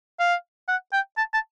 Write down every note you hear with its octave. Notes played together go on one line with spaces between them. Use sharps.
F5
F#5
G5
A5
A5